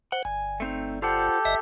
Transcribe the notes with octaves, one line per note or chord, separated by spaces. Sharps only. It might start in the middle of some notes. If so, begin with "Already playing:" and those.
C5 F#5
G1 G#5
A3 C4 D#4
F4 G4 A4 C5 F#5
G1 D#5 E5